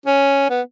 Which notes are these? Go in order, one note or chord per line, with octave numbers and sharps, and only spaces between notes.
C#4
B3